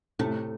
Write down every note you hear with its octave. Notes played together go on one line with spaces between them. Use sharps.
A2 C3 A3